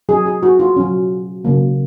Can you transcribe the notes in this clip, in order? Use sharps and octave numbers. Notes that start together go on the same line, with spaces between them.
F#3 C#4 G#4
G#4
F#4
F4
F#3 C#4
C#3 F#3 A#3